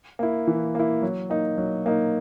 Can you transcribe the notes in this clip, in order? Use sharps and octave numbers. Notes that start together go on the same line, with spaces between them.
A#3 E4
E3
A#3 E4
F#3
A#3 D#4
F#3
A#3 D#4